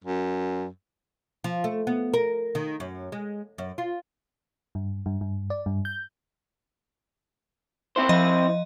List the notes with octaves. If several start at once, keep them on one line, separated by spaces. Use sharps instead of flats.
F#2
F3
A3
B3
A#4
D#3
F#2
G#3
F#2
F4
G2
G2
G2
D5
G2
G6
C4 E4 C5
F3 D#5